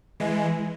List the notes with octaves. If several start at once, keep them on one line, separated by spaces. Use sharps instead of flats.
E3 G#3